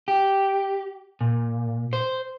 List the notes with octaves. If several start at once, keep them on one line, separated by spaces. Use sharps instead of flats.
G4
A#2
C5